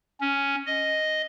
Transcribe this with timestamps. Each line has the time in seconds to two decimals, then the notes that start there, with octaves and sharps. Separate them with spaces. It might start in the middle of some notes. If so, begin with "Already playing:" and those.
0.21 C#4
0.66 D#5